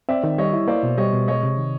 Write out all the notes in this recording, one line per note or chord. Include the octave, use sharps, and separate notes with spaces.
C4 D5 E5
D#3
G3 C#5 D#5
E4
A#3 C5 D5
B2
G3 C#5 D#5
B2
G#3 C#5 D#5
C3
D#3